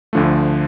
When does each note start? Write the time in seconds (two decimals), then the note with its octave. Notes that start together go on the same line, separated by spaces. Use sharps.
0.13 D2 D3 F3 A3